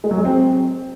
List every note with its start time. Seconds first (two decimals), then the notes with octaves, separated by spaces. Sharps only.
0.04 G#3
0.11 F#3
0.18 G#3
0.25 C4